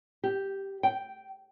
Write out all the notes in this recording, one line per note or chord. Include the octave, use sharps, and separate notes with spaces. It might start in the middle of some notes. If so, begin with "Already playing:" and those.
G4
G5